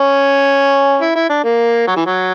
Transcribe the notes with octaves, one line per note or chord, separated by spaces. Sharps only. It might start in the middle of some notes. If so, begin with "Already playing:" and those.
Already playing: C#4
E4
E4
D4
A#3
F#3
E3
F#3